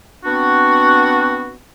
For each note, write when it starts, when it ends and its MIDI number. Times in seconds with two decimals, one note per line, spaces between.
0.25 1.56 59
0.25 1.56 60
0.25 1.56 62
0.25 1.56 66